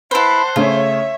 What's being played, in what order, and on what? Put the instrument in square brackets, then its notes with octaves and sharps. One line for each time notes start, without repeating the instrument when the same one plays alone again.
[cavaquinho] E4 B4 [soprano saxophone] C5 [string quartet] F#5 A5 C6
[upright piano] C#3 A3 C#4 [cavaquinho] F4 [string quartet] C#5 E5